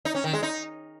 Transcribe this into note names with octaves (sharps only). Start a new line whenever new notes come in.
D#4
C#4
D#3
G#3
D#4